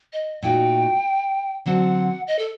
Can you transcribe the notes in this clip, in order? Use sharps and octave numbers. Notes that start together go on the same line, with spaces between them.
D#5
A#2 A3 D#4 F#4 G5
D3 F#3 C4 F#5
D#5
A4